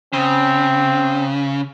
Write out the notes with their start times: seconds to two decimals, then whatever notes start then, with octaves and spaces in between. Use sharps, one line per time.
0.13 C#3 C4